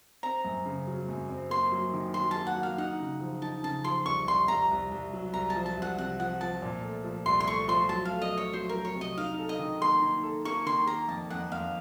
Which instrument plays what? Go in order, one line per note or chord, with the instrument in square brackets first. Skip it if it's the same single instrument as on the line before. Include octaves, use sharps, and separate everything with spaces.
[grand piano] C4 [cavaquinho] A#5
[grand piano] F#2
C#3
F#3
F#2
C4
[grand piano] A#3 [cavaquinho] C6
[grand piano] F#3
D#3
[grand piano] F#3 [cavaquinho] C6
[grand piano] A#3 [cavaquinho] A5
[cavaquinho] F#5
[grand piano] F#3
[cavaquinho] F5
[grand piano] D#4 [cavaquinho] F#5
[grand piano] C#3
F3
[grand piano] D#4 [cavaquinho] A5
[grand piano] C#3 [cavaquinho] A5
[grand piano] F3 [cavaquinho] C6
[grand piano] C2 [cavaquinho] C#6
[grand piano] C2 [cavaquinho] C6
[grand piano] C2 [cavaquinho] A#5
[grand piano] C2
C2
F#3
[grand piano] C2 [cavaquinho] A#5
[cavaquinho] A5
[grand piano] F3
[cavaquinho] A5
[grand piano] C2
[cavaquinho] F#5
[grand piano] C3 [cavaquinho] F#5
[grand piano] F3 [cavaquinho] F#5
[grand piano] F3 [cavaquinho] A5
[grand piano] A#2
A3
F3
[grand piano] C2 [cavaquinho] C6
[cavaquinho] C6
[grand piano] A3 [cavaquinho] C#6
[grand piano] F3 [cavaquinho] C6
[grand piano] F#3 [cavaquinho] A5
[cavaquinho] F5
[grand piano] A3
[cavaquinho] D#5
[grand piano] A3
[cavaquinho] C#5
[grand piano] F#3 [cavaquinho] C5
[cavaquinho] A#4
[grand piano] F#3
[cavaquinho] C#5
[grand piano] C3
[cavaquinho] D#5
[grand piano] D#4 [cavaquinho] F5
[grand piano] A4
[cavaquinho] D#5
[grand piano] D#3
[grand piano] A#3 [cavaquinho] C6
[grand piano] D#4
A4
[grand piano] A#3 [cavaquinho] C#6
[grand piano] D#3 [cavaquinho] C6
[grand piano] A#3 [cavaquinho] A#5
[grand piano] F2 [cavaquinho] A5
[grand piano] F2 [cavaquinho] F#5
[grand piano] F2 [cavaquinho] F5